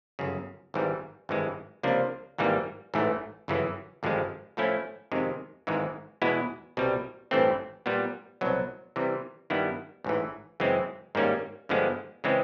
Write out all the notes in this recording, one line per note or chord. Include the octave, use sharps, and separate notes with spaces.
G1 F#2 C#3
G#1 G#2 E3 G3
G#1 G2 E3 G#3
C#2 C3 F3 A#3 D4
G#1 G#2 E3 G3 A#3
A1 G#2 E3 A3
G1 F#2 C#3 E3
G#1 G2 D3 F3 G#3
A2 F3 A3 C#4 E4
F2 C3 D#3 G#3
G#1 G#2 E3 G#3
E2 B2 G#3 B3 E4
C2 B2 G3
A1 G2 E3 A3 C4
A#2 G3 B3
C2 B2 F#3
C3 E3 G3
G2 D#3 G3 B3 E4
A1 G#2 E3
F#2 C#3 E3 G#3 C4
G#2 D#3 G3 A#3 C#4
G2 D3 F3 G#3 B3
C#3 E3 G#3 C4